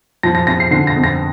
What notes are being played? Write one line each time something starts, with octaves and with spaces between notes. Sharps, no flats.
F3 A#6
A#6
C4 A#6
C7
D3 C7
A#6
F2
A#6